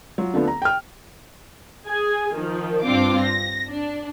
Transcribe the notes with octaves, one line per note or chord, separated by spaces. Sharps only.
F#3 F4
D3 F3 A3 B3
A#5
G5 F6
G#4 G#5
D#3 F3
G2 C4 D4 F4 D6
A#6
D4